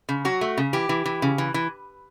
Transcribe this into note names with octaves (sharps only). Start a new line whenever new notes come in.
C#3
F#3 F#4
A3
C#3
E3 G4
E3
E3
C#3
E3
E3